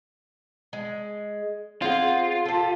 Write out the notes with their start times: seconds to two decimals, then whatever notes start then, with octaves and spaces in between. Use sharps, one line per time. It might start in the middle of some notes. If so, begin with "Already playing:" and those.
0.73 G#3
1.82 C4 F4 G#4 F#5
2.45 G4 A4